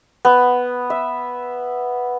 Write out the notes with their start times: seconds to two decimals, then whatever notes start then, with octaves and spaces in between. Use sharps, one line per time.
0.25 B3
0.90 E5